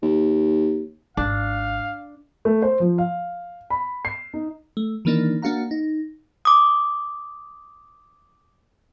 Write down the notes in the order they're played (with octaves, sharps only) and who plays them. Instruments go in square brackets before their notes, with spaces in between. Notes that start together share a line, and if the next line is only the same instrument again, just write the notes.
[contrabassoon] D#2
[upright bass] G#1 [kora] D4 [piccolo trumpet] F5
[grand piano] A3
C5
F3
F5
B5
C7
D#4
[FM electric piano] A3
D#3 E3 A#3 D4 D#4
A#3 D4 F#4 F5 F#5 A#5
D#4
[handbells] D6 D#6